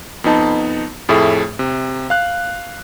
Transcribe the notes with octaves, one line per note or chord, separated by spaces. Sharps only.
F2 B3 D#4 A5
F2 A2 A3 G#4 E5
C3
F5 F#6